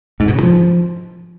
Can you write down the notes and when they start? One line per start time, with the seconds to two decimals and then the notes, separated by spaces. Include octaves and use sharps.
0.20 G#2
0.28 B2
0.35 C#3
0.43 F3